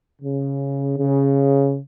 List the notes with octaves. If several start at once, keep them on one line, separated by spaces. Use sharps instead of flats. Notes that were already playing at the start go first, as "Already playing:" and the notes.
C#3
C#3